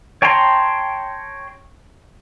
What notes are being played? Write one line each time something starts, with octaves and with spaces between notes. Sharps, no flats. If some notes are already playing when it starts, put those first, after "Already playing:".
C#5 G5 A5 A#5 C6